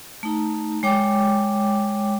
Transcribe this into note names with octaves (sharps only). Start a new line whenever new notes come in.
A3 D#4 A#5
G#3 C#5 G5 D6